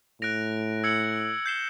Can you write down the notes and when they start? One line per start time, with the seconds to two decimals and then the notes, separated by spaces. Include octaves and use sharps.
0.21 A2 F#6 A#6 D7 F7
0.84 E6 G#6 C#7 F#7
1.46 G6 C7 E7 G7